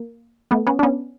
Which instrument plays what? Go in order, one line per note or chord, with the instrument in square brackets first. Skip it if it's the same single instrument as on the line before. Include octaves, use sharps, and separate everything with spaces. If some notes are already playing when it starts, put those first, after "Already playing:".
Already playing: [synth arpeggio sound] A#3
A3 B3
B3 C#4
D4
B3 C#4